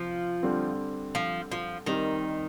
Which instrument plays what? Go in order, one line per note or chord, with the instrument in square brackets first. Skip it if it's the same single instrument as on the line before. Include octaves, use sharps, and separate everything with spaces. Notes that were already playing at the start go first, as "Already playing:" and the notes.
Already playing: [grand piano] C3 [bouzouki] F3
[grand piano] D3 G3 C4
[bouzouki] F3
F3
[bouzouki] D#3 [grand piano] G3 C4 D#4 G4 A#4